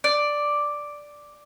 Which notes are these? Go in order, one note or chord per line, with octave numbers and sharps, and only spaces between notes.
D5